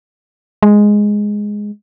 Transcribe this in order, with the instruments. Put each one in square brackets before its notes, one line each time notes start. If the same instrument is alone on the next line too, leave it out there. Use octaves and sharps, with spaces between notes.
[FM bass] G#3